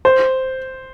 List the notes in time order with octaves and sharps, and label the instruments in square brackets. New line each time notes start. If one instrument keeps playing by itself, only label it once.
[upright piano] C5